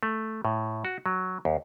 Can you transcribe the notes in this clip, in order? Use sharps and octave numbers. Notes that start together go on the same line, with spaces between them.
A3
A2
F#4
F#3
D#2